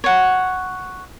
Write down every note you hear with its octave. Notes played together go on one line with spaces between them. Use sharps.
C#5 F#5